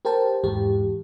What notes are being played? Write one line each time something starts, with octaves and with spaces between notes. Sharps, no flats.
G4 A#4 C5 G5 A5
E2 G#2 E3 G4